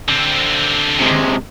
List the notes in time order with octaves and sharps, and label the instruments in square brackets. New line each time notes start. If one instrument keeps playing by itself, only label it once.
[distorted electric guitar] D3 C4
[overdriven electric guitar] C3 G#3